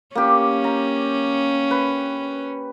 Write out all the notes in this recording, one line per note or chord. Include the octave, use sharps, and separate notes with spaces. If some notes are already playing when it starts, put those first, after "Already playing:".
A#3 C#4 G4
A#5
B4